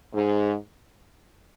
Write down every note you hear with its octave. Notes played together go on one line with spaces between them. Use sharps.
G#2